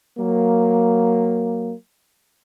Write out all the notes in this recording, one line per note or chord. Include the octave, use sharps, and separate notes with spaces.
F#3 A#3